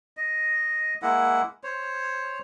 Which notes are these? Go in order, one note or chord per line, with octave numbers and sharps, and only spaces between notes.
D#5
G#3 A#3 E4 F#5
C5 C#5